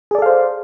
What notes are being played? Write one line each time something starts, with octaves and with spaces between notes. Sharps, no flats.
G#4 A4 C5 D5 F5